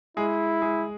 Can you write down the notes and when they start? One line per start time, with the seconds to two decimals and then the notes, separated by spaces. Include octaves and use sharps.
0.17 G#3 E4 G#4
0.62 G#3 G#4